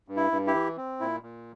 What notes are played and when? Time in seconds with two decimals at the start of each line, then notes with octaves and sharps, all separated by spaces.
0.08 G2
0.17 E4
0.31 G2
0.47 E4 G4
0.54 E3
0.77 C4
1.00 A#2 E4
1.23 A#2